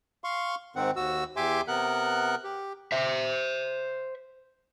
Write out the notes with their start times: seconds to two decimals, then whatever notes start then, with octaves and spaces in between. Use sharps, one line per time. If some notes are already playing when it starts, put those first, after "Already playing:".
0.24 F5 C6 C#6
0.76 G#2 D#3 C4 F#5
0.96 D#2 F#4 E6
1.36 E2 G4 E5 G#5 C6 D6
1.68 C3 B3 A#4 F#5 F#6
2.44 G4
2.92 C5 E5